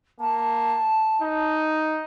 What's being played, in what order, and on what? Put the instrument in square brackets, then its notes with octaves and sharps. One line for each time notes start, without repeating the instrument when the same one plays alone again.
[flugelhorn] A#3 [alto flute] A5
[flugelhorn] D#4